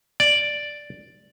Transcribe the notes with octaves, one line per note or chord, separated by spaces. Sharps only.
D5